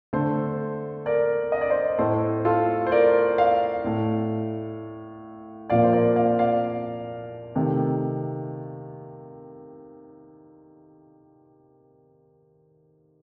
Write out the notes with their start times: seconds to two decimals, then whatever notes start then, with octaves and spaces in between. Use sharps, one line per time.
0.13 D3 A3 A4 C5
1.06 A#4 D5
1.52 D#5
1.61 D5
1.70 C5 D#5
1.98 A2 A3 A4 C5
2.45 F4 A4
2.87 C5
2.92 A#4 D5
3.38 D5 F5
3.84 A2 A3
5.70 A#2 F3 A#3 D5 F5
5.84 C5
5.93 A#4 D5
6.16 D5 F5
6.39 D5 F5
7.56 C3 D#3 A3